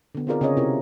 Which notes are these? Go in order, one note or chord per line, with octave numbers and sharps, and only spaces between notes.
D3 B3
C4 D#4 F4 G#4 A#4 D5
C#3 C4 G#4 C#5 D#5
C3 E4 F4 G4 A#4